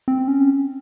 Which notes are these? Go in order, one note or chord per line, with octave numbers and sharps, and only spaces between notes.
C4
C#4